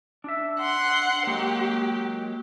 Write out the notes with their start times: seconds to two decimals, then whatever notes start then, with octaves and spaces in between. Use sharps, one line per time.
0.24 D4 E5
0.60 F#5 C6
1.27 F#3 G#3 A#3 G4